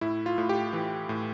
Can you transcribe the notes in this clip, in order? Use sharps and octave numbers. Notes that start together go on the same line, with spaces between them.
A2 E4
F4
A2
G4
E3
A2